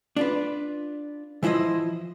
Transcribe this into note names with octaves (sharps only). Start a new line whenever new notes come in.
D4 F4 B4
E3 F3 E4 C5 D#5